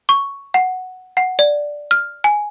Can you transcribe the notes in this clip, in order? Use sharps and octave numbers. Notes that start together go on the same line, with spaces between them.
C#6
F#5
F#5
D5
F6
G#5